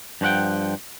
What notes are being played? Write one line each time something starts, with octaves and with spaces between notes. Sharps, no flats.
G2 F3 F#4 F#5 G5